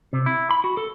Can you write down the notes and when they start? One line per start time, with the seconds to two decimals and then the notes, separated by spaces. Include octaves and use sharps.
0.13 C3
0.26 E4
0.51 B5
0.64 F#4
0.77 A4